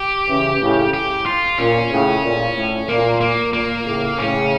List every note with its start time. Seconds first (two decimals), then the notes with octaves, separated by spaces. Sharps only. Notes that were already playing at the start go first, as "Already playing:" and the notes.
Already playing: G4
0.28 C#3 E3
0.61 A2 C#3
0.94 G4
1.26 F4
1.58 A#2 C#4
1.91 A2 C#3
2.23 A#2
2.56 A2
2.88 A#2 A#3
3.21 A#3
3.53 A#2 A#3
3.86 A2 C#3
4.18 A2 C#3 C#4